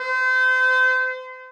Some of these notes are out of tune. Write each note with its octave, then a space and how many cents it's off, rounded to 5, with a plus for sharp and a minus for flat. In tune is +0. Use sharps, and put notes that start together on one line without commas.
C5 -35